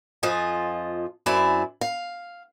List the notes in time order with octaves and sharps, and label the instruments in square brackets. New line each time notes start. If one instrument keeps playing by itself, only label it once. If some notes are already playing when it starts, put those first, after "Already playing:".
[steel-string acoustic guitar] F2 F3 F4 D#5 G#5
F#2 C4 E4 D5 G#5
F5